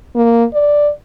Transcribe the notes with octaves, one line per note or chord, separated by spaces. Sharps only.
A#3
D5